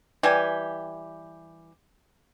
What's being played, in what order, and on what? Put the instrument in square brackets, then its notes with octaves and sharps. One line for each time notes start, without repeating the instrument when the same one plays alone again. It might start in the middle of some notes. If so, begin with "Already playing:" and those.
[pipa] E3 G3 G4 G#5